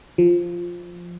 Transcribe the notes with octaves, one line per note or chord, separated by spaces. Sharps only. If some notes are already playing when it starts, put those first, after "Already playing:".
F3